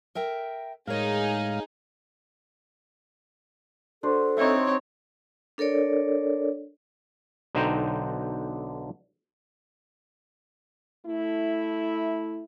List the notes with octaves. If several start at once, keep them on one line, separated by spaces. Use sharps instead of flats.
A#4 E5 G5
A2 G#3 D#4 G#4 A#4 C#5 F5
D4 F#4 A4 C5
C4 D#4 C#5 E5
D4 A4 A#4 C#5 D5
B1 D3 D#4 C5 G5 A#5
A3 E4